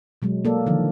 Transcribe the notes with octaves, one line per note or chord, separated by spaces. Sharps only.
B2 F#3 G#3
A#3 A4 D5
D3 D#3 F3